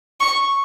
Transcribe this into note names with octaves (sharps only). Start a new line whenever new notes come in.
C#6